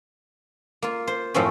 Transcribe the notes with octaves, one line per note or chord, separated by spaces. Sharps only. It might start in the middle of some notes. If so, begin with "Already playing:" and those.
A#3 F4
C5
F#2 A2 F3 A3 C4 C#4